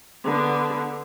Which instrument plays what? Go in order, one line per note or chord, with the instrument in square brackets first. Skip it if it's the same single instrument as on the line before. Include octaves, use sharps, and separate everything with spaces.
[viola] D3 B3